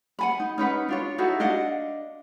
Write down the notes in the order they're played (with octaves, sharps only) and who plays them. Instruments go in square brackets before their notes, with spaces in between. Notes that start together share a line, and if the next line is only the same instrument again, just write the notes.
[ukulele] F#5 G#5 B5
D#4
C#4 D#4 B4 F#5
D4 F4 C#5
D#4 E4 F#4 A4
D4 D#5 F5 F#5